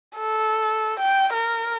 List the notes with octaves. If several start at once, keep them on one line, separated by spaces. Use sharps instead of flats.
A4
G5
A#4